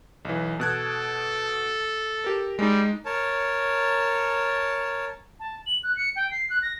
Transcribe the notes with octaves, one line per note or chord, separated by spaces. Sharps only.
B1 E3
B2 A4 F#6 G#6
G4 A#4
G3 G#3 D#4
A#4 C#5 A5
A5
F#7
F#6
C#7
G5
C7
F#6
A#6